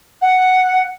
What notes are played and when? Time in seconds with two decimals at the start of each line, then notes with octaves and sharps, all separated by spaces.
0.21 F#5